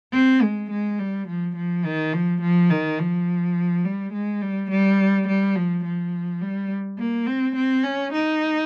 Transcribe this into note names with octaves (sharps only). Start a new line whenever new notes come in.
C4
G#3
G#3
G3
F3
F3
D#3
F3
F3
D#3
F3
G3
G#3
G3
G3
G3
F3
F3
G3
A#3
C4
C4
C#4
D#4